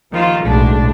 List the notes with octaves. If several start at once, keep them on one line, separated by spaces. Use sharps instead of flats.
D#2 D#3 F3 F4
B1 A2 G#3 D4